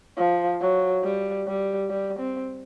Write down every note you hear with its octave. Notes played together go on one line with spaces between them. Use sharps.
F3
F#3
G3
G3
G3
C4